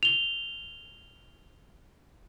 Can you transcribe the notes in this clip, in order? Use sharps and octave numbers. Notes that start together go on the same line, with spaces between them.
F7 G7